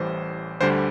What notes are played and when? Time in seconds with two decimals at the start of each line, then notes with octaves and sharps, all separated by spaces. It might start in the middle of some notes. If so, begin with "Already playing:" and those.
Already playing: A1 A2 E3 G3 C5
0.61 D2 D3 G3 C5